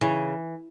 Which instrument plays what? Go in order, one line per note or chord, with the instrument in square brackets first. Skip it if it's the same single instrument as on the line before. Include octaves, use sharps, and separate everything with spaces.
[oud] C#3 [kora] E3